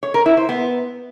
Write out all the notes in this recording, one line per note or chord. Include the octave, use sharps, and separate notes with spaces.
C#5
A#4
E4
C5
B3